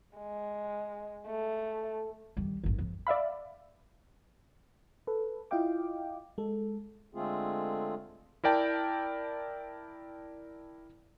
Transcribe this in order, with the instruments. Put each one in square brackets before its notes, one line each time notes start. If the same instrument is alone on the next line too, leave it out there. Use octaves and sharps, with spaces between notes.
[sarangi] G#3
A3
[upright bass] D#3 G3
G#1 D2
F2
[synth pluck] D5 E5 F5 B5
[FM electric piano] A4 B4
E4 F4 D#5 F5 G5 D6
G#3 A4
[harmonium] D3 G#3 A3 C4 F4 G#4
[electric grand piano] E4 A#4 D5 G5 A5